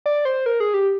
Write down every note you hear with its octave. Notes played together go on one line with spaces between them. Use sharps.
D5
C5
A#4
G#4
G4